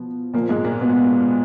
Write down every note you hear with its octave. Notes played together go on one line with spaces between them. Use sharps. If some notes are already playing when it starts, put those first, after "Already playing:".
Already playing: B2 F3 B3
A#2 F3 A#3
G#2 G#3
A#2 A#3
B2 B3